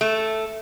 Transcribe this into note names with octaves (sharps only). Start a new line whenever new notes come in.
A3